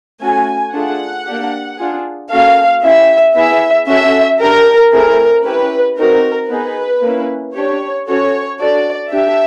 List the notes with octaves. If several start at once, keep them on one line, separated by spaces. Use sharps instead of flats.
A3 C#4 F#4 A4 G#5
A3 D4 F4 G#4 F#5
A#3 D4 G4
D4 F4 G#4
A#3 C#4 F#4 A4 F5
C#4 E4 G4 E5
B3 E4 G#4 E5
C#4 F#4 A4 E5
D4 G4 A#4
A3 C4 E4 G#4 A#4
C#4 E4 G4 B4
C4 D#4 F#4 A#4
B3 D#4 G#4 B4
A#3 C#4 E4
D4 G4 C#5
C#4 F#4 A4 C#5
D4 F#4 A4 D5
D4 G4 E5